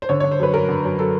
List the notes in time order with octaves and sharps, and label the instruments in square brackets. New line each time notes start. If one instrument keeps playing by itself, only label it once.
[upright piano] C5
D3 C#5
D3 C#5
C5
F#2 B4
F#2 A#4
D3
F#2
F#3 A4